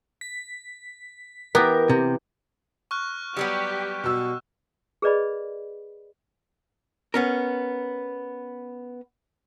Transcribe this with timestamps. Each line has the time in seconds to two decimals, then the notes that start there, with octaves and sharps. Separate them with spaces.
0.21 B6
1.55 E3 B3 G4 A#4
1.90 C3
2.91 C#6 F6 F#6
3.37 F#3 G3 B3 G4
4.04 B2 E6
5.02 G#4 A#4 B4 D5 D#5 B5
7.14 B3 C#4 A#4